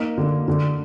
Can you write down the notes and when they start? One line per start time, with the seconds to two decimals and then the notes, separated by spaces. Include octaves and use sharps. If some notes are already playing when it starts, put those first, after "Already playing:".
Already playing: A#3 D#4
0.18 D3
0.48 D3